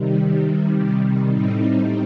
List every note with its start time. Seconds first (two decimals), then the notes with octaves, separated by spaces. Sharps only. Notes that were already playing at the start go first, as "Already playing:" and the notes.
Already playing: C3 D#3 G3
1.28 A2 G3 C4 D#4